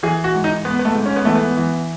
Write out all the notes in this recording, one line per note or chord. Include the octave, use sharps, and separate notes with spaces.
E3 G#4
F#4
G#2
D#4
G#2 B3
B3
A3
G#2
C#4
B3
E3 A3
B3
E3